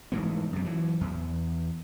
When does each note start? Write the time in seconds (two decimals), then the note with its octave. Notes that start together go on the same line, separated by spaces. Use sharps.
0.12 F1 G#2 E3 B3
0.52 F#2 C3
0.65 E3 F#3
1.01 E2